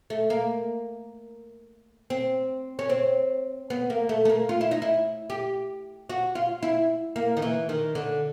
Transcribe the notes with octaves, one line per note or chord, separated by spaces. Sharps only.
A3
A#3
C4
C#4
C4
B3
A#3
A3
A3
A#3
F4
E4
D#4
E4
G4
F#4
F4
E4
A#3
D#3
E3
D#3
D3